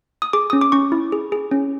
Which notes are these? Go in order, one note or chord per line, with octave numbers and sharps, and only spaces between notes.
D#6
G#4 D6
C#4 D#6
D6
C#4 C#6
E4
G#4
G#4
C#4